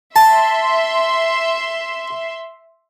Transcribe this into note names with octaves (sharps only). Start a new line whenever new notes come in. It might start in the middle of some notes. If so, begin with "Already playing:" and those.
E5 A5 C6